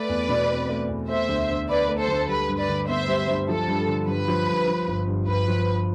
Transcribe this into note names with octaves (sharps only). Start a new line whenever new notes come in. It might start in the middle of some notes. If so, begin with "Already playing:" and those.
Already playing: A3 B4 D5
E2
B2
C4
A3
E2
A3 C5 E5
D2
D3
D4 B4 D5
A3
A4 C5
D2
G3 B4
G2
B4 D5
D3
B3 C5 E5
G3
G2
F3 A4
G2
D3
G2 B4
F3
G2
F3
G1
G2
G1 B4
F3